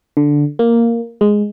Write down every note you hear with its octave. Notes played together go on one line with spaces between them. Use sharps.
D3
A#3
G#3